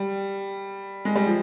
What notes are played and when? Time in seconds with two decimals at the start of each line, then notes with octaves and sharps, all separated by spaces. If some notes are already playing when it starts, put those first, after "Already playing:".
Already playing: G3
1.05 G#3
1.16 G3
1.26 F3